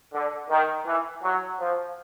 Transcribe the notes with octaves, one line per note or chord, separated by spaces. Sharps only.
D3
D#3
E3
F#3
F3